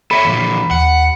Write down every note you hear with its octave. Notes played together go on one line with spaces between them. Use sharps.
A4 C#5 E5 B5
F2 A#2 E3
D#2 F#5